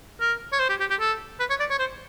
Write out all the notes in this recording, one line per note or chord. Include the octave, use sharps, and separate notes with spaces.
A#4
C#5
C5
G4
G4
G4
A4
B4
C#5
D5
C#5
C5